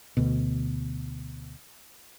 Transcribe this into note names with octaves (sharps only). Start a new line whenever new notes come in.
D2 B2